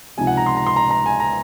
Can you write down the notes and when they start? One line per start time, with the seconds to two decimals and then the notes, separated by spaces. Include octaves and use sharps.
0.17 C#2 C3 F3 C4 D#4 G#5
0.27 F#5
0.37 A#5
0.46 C6
0.56 A#5
0.66 C6
0.76 A#5
0.91 A#5
1.06 G#5
1.20 A#5